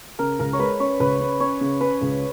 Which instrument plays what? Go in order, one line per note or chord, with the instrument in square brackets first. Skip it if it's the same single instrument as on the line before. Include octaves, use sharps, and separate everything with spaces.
[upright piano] C#3 [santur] A#4
[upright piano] C#2 [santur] A#4
[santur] C#5
[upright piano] G#3 [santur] B4
[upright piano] C#4 [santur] C#5
[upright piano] C#2 [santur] B4
[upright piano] C#3
[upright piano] C#4 [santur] C#5
[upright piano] C#3
[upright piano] C#4 [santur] B4
[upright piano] C#2